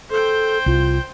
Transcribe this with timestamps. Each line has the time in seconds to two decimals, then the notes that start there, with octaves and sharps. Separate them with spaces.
0.11 A4 C5 G5
0.66 C2 F4